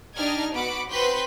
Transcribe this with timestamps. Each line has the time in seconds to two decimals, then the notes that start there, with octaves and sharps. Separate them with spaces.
0.16 D4 D#4 G4 D#5 F6 G#6
0.54 B3 F#4 B5 D6 C#7
0.89 C4 F#4 B4 C6 G6 B6